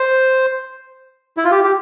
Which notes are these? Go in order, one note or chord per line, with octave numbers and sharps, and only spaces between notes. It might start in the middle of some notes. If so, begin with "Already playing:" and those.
Already playing: C5
E4
F4
G4
G4